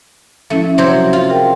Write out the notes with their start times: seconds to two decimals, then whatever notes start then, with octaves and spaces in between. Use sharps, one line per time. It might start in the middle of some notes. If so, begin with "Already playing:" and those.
0.50 F3 A3 C#4 E4
0.78 C3 F#3 C5
1.13 F4
1.30 G#4 A#4 G5